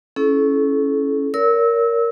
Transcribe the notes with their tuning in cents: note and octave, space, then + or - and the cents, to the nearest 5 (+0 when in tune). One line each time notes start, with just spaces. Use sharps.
C#4 +0 E4 +0 A4 -35
A#4 +0 C#5 +40 E6 -25